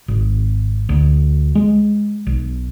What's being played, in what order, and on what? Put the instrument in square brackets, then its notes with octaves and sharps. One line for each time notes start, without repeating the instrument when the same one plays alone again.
[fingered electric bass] G#1
D2
G#3
B1